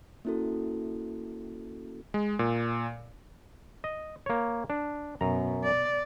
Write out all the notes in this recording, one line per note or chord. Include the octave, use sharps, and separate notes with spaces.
A#3 C#4 E4 F#4 A4
G#3
A#2
D#5
A#3 C#5
D4
F#2 B2 A#5
D5